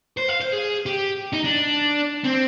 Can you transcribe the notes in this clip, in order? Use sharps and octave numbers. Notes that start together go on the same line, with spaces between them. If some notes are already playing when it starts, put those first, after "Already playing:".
C5
F5
C5
G#4
G4
D#4
D4
C4